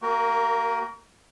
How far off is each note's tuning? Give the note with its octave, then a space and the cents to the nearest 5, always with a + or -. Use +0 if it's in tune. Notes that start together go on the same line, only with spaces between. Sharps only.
A#3 -25 F#4 +35 A#4 +0